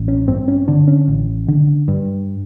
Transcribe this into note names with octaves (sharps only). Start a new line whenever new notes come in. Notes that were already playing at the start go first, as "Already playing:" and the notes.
Already playing: A1
C#4
G2 C4
C#4
D3 D4
C#4
A1
D3
G2